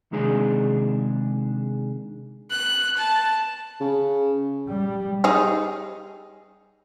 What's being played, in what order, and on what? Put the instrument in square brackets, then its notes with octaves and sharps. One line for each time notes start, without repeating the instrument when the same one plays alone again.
[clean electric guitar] C3 D#3 G#3 D4 G#4
[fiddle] F#6
A5
[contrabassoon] C#3
[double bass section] G3
[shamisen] G3 D#4 G#4